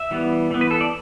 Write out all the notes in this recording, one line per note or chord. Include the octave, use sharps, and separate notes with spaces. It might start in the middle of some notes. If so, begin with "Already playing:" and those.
Already playing: E5
E3 G3 B3
E3 B3
B4
A4
D5